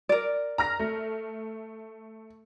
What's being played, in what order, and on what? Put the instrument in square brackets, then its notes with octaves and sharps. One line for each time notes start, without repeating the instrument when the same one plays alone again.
[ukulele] A#4 D5
[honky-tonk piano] A#5 F6 A#6
A3